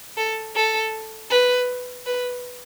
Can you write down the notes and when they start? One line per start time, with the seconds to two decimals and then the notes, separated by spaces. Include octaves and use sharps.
0.17 A4
0.56 A4
1.30 B4
2.06 B4